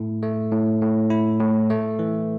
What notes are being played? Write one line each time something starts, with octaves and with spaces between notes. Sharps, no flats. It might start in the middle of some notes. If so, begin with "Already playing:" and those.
Already playing: A2 A3 E4
A3
A2
A2
E4
A2
A3
E3